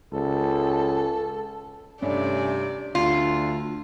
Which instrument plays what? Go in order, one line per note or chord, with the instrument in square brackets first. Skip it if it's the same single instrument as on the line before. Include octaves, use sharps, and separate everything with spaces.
[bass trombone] C#2 [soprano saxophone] A4
[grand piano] G2 A3 [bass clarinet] C3 [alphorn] C#4 [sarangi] D5
[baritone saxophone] D2 [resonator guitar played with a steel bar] F4